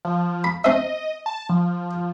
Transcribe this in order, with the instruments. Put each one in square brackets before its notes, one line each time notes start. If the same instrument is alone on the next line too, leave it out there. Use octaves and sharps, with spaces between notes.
[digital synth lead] F3
[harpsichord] B5
[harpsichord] C4 E5 [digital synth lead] D#5
[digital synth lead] A5
F3